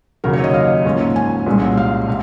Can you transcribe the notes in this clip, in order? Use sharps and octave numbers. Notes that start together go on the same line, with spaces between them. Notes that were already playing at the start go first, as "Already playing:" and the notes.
D#2 C#3 F#3 A#3 A#4
C#5
D#5
F5
G#2 F3 A#3 C#4
G#5
C2 A#2 G#3 C#4
F5
C3